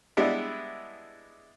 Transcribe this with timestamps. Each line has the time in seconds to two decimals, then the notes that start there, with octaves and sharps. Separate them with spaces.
0.17 G3 G#3 B3 D4 E4